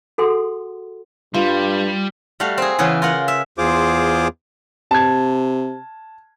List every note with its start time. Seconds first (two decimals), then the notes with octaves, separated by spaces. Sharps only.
0.18 F#4 G#4 A4 F#5 G#5 C6
1.34 G2 G3 F4 B5 C#6
2.40 G3 A3 F#4 F5
2.58 C4 G#4
2.79 C#3 E3 B3 G#4
3.02 F4 A#4 F#5
3.28 E5
3.58 E2 F4 G#4 C5 D6
4.91 C3 A5 G#6